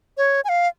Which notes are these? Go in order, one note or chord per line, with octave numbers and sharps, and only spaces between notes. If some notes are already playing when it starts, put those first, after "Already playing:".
C#5
G#5
F5